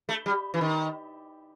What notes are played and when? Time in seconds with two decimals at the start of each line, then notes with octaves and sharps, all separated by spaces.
0.09 A3
0.26 G3
0.54 E3
0.61 D#3